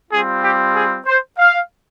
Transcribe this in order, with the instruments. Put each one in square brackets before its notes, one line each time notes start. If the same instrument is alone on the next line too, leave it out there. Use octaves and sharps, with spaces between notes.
[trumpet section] G3 C4 F4 G#4
G4
G#4
C5
F5